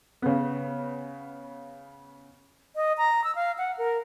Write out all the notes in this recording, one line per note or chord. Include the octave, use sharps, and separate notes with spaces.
C#3 B3
D#5
A#5
E6
F5
F#5
A#4